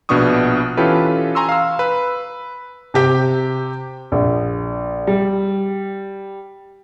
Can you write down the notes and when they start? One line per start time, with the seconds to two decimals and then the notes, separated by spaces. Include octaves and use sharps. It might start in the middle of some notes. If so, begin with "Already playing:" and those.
0.09 A#1 B2 B3 D4 C#6 D#6
0.77 E3 C#4 F4 G4 A4 B4
1.35 G#5 A#5 C6 C#6 E6
1.49 F5 E6
1.79 B4
2.94 C3 G4 G5
4.12 A#1
5.07 G3